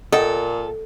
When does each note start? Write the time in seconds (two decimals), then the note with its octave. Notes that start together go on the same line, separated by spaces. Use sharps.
0.12 A#2 A4 D#5 F#5 G5